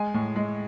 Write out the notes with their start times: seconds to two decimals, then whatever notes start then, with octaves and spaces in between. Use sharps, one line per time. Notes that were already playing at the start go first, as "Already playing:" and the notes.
Already playing: G#3 G#5
0.14 A2
0.36 G#3